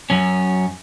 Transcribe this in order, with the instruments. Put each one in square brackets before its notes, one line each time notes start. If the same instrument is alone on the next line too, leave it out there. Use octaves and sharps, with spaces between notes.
[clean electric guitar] F#2 C#4